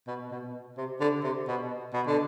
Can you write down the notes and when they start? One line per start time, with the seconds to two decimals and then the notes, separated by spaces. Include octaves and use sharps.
0.07 B2
0.31 B2
0.77 C3
1.01 D3
1.24 C3
1.48 B2
1.94 B2
2.07 D3